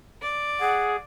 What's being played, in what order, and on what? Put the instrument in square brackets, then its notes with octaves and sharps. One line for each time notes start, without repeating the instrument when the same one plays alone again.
[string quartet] D5
[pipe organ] G#4 [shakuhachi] F#5